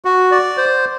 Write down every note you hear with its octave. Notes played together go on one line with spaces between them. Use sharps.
F#4
D5
C5